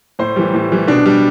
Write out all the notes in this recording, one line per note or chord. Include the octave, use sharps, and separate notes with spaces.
A2 C5
E3 G3
A2
E3 G3
B2 D4
G3